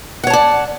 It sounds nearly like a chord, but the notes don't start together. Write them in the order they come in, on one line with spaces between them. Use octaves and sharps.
F#5 C#5 A5 D5